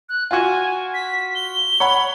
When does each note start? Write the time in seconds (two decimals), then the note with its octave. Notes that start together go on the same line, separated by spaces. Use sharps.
0.09 F#6
0.31 F4 F#4 G#5
0.94 B6
1.35 G7
1.80 C#5 F#5 B5